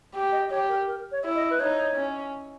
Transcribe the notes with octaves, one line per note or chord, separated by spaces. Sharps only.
G4
D#5
G4 C#5
A#4
A#4
C#5
E4
D#5
B4
D#4 C#5
C#4